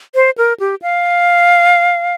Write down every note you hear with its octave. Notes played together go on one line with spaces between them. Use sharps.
C5
A#4
G4
F5